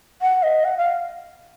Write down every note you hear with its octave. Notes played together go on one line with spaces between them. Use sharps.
F#5
D#5
F#5
F5